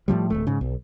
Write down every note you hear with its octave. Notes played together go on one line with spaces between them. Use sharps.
A2 C#3 F3 G3
D1 F2 A3
G#2 C#3
B1